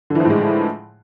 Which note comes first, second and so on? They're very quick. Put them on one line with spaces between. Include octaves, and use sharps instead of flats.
D3 E3 F3 A2 G#3